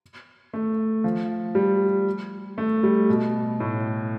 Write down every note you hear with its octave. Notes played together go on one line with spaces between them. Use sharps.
A3
F3
G3
A3
G3
B2
A2